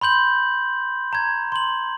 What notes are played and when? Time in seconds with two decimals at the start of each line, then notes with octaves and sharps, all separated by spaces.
0.01 B5 C6 G6 F#7
1.13 A#5 G#6
1.52 C6 F#7